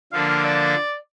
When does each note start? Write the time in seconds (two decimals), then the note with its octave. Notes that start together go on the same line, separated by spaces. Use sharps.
0.12 D3 F3 A#3 D4 F5
0.28 F5
0.44 D5